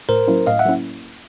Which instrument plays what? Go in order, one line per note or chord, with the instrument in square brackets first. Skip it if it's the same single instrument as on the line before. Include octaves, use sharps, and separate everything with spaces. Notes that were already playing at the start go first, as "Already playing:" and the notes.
[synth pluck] A2 [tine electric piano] A#4 C5
[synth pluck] F#3 A#3 C#4 E4
[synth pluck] A2 [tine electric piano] D#5 F5
[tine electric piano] E5 F#5
[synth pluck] F#3 A#3 C#4 E4